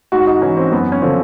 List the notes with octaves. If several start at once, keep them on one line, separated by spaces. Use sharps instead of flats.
G#2 F#4
D#4
E3 C#4
C4
F#2 B3
C#4
D3 F3 C4